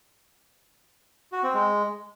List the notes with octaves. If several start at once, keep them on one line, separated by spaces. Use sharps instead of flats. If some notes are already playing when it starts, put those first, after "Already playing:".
F#4
C4
G#3